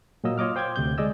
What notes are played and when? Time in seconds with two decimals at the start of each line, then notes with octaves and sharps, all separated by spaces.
0.24 A#2 F#3 A#3 D#5 E6
0.38 F4 C#5 D#5 D6 F6
0.56 C5 G5 D6 G6 G#6
0.76 D2 C3 G6
0.98 G#3 D5 D#5 E6